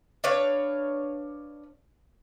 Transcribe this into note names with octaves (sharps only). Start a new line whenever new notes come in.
D4 B4 C#5 F5